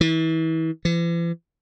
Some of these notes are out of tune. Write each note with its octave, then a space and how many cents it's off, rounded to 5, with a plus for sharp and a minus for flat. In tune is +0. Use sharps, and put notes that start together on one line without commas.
E3 -35
E3 +45